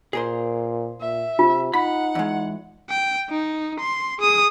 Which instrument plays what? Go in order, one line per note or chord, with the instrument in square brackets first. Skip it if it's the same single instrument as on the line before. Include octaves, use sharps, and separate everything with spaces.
[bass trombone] A#2 [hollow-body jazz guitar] G#4 A#4 C5
[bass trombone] A#2 [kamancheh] E5
[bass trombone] C3 [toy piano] F4
[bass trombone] D#4 [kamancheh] F#5 [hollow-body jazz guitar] B5
[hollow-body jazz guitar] E2 G#3
[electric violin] G5
D#4
C6
G#4 D#6